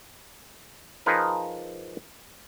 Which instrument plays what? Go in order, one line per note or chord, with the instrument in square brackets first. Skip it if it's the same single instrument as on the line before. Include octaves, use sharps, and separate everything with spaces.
[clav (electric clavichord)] F3 D#4 G#4 A#4 B4